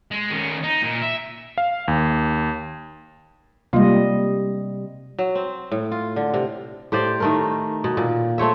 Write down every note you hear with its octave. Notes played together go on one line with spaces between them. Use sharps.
G#3
D#3 C#4
D#4
A#2
E5
F5
D#2
C3 G3 G#3 A#3 F4 D#5
F#3
C4
A2
F4
D3
C3
A2 G4 C5 D5
D#3 A3 A#4
B2
A#2
A3 C4 C#5 E5